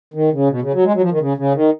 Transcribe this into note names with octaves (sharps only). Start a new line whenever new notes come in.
D#3
C#3
B2
C#3
F#3
G#3
F#3
F3
D#3
C#3
C#3
D#3